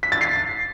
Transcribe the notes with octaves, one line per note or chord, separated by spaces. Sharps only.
B6
A6
C7